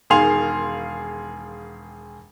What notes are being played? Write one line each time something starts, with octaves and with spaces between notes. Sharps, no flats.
E1 D#3 G#4 F5 C6 F7